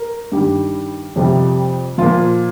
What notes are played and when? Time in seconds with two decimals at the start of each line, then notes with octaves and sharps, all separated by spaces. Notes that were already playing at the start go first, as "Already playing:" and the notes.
Already playing: A#4
0.32 G2 D#3 G3 G4
1.16 F2 C3 G3
1.98 A#2 F3 F4